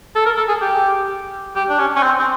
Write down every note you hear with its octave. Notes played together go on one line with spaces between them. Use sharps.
A4
A#4
A4
G#4
G4
G4
D4
C#4
C#4
C4
C4